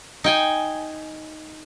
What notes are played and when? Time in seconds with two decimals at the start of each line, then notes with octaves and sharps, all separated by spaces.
0.24 D#4 G5 G#5